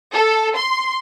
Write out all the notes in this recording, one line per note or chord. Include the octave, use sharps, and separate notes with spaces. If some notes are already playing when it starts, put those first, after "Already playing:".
A4
C6